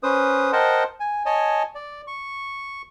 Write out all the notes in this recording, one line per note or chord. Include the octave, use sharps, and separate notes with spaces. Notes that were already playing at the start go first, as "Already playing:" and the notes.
C#4 B4 C5 D#6
A#4 C5 D#5 F#5 G5 A5
G#5
C#5 D#5 G#5 A5
D5
C#6